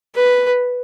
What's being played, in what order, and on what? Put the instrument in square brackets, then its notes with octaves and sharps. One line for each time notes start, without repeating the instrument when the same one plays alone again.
[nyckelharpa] B4